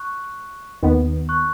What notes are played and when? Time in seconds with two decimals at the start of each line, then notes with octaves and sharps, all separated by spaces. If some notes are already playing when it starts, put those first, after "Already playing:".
Already playing: C#6 F#6
0.82 D#2 D#3 B3
1.29 C#6 F#6